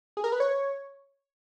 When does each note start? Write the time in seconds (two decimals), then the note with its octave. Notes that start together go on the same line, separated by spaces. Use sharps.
0.17 G#4
0.24 A#4
0.32 B4
0.40 C#5